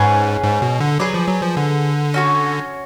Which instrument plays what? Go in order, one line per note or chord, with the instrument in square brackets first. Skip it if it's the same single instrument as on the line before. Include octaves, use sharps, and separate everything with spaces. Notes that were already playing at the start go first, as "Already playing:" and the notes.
Already playing: [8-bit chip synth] G#2 [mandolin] C#4 G#4 B4 F#5
[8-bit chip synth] G#2
B2
D3
[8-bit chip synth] F#3 [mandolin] G#4 B4 D5
[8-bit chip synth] F3
F#3
F3
D3
[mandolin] C#4 F#4 C#5